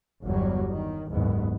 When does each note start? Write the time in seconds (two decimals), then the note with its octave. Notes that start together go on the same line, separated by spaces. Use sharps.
0.24 G1 E2 F#3 G3
0.71 D#3
1.10 F#1 D#2 G#2 B3